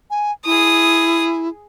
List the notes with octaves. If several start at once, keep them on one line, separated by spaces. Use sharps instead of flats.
G#5
E4 G#4 D#6